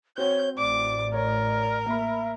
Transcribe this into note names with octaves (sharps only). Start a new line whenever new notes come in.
C4 F#4 C#5 G6
A1 A2 D5 D6
A#4 C#5
A#3 E5 B5